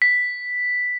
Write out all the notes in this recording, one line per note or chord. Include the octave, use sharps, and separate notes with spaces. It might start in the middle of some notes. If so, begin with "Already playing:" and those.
B6